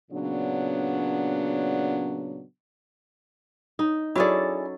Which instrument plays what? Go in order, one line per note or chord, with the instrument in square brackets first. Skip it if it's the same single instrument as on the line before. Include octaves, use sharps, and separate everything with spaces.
[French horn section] A#2 C#3 F#3 B3 D4
[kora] D#4
[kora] F#3 C#4 A4 [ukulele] E4 G#4 D5